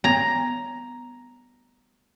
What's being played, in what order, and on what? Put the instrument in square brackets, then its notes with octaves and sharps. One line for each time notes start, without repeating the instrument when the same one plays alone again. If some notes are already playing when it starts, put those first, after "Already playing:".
[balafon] B3 C#5 [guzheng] A#5